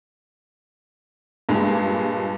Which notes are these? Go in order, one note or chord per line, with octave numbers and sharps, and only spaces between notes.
G2 A#2 G#3